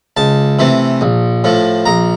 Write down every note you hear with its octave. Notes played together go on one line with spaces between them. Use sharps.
C#2 A5
C3 E3 A3
A#1
A2 F3 A3
A#1 A#5